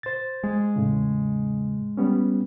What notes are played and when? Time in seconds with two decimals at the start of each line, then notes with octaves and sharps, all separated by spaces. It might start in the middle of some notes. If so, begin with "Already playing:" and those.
0.03 C5 A6
0.44 G#3
0.76 E2 A2 C#3
1.97 G3 B3 C#4